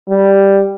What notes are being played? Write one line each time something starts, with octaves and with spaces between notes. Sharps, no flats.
G3